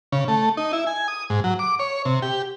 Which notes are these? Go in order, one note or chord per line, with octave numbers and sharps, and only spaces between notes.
C#3
A3
D#4
E4
G#5
D#6
G#2
F#3
D6
C#5
C3
G4